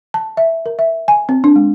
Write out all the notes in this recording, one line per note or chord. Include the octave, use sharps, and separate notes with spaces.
A5
E5
A#4
E5
G#5
C4
D4
G#3